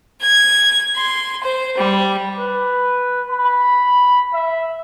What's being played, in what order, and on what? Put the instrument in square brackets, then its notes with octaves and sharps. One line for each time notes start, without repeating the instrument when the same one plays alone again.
[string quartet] G#6
C6
C5
G3
[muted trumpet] B4
B5
E5